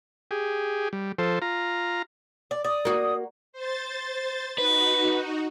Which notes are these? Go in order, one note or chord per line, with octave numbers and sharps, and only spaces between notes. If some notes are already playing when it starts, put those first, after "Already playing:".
G4 G#4
G3
F3 A4 C5
F4 A#5
D5
D5 D#6
A#3 F#4
C5 A6
D#4 F#4 B4